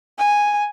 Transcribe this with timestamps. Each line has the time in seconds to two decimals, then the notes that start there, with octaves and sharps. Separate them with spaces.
0.19 G#5